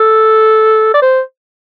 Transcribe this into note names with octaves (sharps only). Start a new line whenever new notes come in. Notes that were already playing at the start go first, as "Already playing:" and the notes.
Already playing: A4
D5
C5